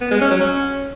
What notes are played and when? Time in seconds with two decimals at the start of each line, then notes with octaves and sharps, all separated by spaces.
0.01 B3
0.11 G#3
0.21 C#4
0.31 F#3
0.41 C#4